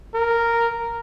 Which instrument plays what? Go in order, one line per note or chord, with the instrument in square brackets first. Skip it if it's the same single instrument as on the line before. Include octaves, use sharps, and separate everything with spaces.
[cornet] A#4